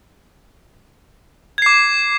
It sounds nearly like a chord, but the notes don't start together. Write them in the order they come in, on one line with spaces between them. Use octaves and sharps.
G#6 C7 D6